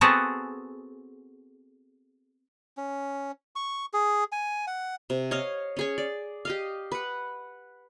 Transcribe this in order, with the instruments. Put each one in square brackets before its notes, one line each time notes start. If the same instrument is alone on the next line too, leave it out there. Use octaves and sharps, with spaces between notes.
[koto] B3 C4 F#4 G#4 A4
[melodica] C#4
C#6
G#4
G#5
F#5
[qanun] C3
C#5 D#5 F5
C#4 G#4 C#5
D5
G4 D#5 F5
B4 F#5